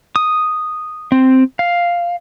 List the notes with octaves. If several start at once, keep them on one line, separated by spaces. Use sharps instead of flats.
D#6
C4
F5